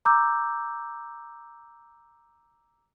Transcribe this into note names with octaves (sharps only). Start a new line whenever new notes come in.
A#5 D6 E6 G6